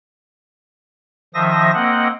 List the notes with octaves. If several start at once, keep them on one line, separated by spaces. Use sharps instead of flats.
D#3 F3 C5 E5 D#6 A#6
A#3 C4 D#5 F#5